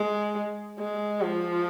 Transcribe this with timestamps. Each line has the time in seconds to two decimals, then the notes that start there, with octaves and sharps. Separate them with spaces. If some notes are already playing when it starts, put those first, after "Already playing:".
Already playing: G#3
0.79 G#3
1.21 F3